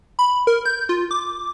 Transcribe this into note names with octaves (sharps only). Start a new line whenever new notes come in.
B5
A#4
G6
F4
D6